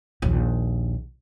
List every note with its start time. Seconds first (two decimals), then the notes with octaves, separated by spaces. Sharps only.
0.22 A#1 D#2